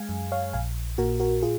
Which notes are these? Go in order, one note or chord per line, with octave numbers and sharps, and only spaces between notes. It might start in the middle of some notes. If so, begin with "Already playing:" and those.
Already playing: G#3 F5 G#5
F#2
C#5 F5
A#1 F5 G#5
A#2 F#4 A#4
F#4 A#4
F4 G#4